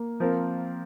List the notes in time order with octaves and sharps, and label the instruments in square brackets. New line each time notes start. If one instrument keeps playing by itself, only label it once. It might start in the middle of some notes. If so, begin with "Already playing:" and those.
Already playing: [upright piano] A#3
[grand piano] F3 C4 F4 A#4